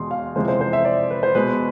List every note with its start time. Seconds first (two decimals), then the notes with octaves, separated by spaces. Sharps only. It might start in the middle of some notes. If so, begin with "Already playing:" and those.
Already playing: E2 B2 G#3 C6
0.11 F5
0.36 F2 C3 E3 G#3 C5
0.48 C5
0.61 C5
0.73 E5
0.85 D5
1.10 B4
1.23 C5
1.35 B2 G#3 B4